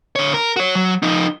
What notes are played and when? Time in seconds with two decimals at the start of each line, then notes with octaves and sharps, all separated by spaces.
0.16 D3 C#5
0.34 A#4
0.56 F#4 C#5
0.75 F#3
1.02 F3 D#4